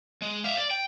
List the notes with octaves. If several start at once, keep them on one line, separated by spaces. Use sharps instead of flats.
G#3
E5 F5
D5
G5